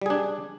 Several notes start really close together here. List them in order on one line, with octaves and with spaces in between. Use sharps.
G3 G#4 D4